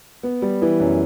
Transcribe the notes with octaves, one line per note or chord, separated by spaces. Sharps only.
B3
G3
E3
F#2